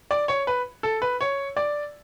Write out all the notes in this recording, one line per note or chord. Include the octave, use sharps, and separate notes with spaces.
D5
C#5
B4
A4
B4
C#5
D5